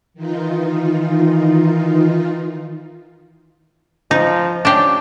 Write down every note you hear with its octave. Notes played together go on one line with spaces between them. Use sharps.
D#3 E3 D#4 F4
F3 D#4
C#4 D4 G4